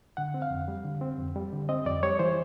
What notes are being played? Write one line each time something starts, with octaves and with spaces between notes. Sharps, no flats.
D3 F#5
C4
F5
F2
G3
D3
C4
F2
G3
D3
C4 D#5
F2 D5
G3 C#5
E3 C5